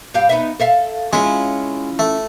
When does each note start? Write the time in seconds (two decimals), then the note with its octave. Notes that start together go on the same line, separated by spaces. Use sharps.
0.14 G2 G4 F5
0.29 B3 D#4 E5
0.60 A4 E5 F5
1.13 G#3 C#4 E4 F4
1.99 A3